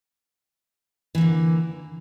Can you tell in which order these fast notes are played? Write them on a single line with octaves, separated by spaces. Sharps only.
E3 A#3 D3